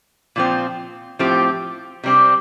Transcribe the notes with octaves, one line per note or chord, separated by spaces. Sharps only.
A#2 F3 C4
A2 F3 C4 G4
C3 G3 C4